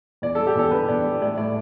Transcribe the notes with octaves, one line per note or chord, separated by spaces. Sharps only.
E2 D5
A4
G3
G4
E2 A4
D3 B4
E2 D5
G3
A2 D5
A2 D5